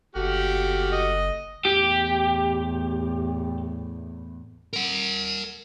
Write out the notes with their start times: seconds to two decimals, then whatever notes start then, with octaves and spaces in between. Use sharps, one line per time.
0.15 F#1 A3 F#4 G4 F6
0.92 D#5
1.65 E2 A2 G4
4.73 A#4 F#5